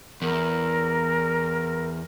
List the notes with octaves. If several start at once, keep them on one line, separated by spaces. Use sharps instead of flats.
E2 A#4